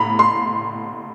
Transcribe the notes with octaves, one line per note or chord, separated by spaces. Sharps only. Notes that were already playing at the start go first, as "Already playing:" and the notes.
Already playing: A2 A#5 B5
C6